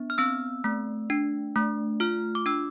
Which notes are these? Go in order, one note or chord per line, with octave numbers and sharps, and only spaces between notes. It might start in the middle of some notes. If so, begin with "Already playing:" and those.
Already playing: B3 D4
F6
C4 E6
A3
D4
A3
F4 F6
D6
D4 E6